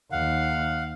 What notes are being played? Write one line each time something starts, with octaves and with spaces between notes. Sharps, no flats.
D#2 F5 F#5